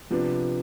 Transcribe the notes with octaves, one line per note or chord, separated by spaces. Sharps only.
C3 F3 B3 D4